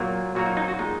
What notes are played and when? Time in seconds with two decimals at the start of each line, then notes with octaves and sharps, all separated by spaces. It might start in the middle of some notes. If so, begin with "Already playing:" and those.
Already playing: A#2 F#3 A#3
0.35 A#2 F#3 A#3 F#4
0.46 D#4
0.57 D#4
0.68 F#4
0.79 A#2 G#3 D#4